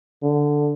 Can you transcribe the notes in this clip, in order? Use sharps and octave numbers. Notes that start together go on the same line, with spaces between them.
D3